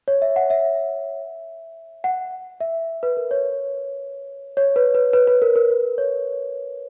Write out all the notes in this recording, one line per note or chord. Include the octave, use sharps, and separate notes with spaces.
C#5
E5
F#5
E5
F#5
E5
B4
A#4
C#5
C#5
B4
B4
B4
B4
A#4
A#4
B4
C#5